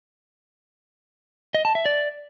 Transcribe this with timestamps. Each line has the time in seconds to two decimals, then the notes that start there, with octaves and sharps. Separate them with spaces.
1.54 D#5
1.65 A5
1.75 E5
1.86 D5